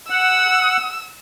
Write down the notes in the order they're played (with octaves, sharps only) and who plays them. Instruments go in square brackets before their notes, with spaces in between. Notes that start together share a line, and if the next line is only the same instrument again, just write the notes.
[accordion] F#5 [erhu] E6